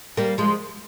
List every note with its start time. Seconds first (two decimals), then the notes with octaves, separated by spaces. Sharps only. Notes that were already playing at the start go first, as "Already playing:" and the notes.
0.17 G3 A#3
0.38 F3 G#3